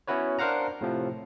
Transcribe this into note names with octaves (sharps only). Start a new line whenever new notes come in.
B3 C#4 E4 F#4 B4 C#5
D4 A#4 C5 F5 F#5 A#5
A2 C3 F3